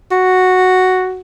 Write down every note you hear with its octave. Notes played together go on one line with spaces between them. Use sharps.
F#4